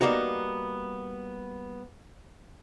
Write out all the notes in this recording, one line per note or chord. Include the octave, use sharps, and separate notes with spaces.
G3 A#3 B3 D#4 F#4